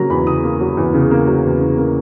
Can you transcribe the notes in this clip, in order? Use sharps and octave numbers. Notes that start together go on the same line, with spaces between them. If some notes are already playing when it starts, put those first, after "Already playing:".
Already playing: C#3 F#3 A#3 A#5
E2 B5
C#3 D#6
A#3
F#3
E2
C#3
A#3
F#3
E2
C#3
A#3